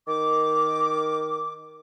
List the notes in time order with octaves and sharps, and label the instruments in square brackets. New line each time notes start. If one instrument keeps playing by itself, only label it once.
[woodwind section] D#3 D6